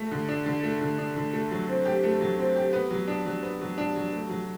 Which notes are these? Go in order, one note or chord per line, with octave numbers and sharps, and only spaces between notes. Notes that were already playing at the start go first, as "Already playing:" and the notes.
Already playing: A3
D3
D4
D3
A3
D3
D4
D3
A3
F#3
C4
G4
A3
F#3
C4
G4
B3
F#3
D4
F#3
B3
F#3
D4
F#3
A3
F#3